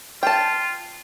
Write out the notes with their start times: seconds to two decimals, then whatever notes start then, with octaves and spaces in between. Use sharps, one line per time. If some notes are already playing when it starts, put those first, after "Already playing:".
0.23 F4 G5 A5